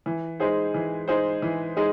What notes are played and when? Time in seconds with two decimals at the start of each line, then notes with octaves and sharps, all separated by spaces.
0.06 E3
0.40 G#3 D#4 G#4 C5
0.74 E3
1.08 G#3 D#4 G#4 C5
1.42 E3
1.77 G#3 D#4 G#4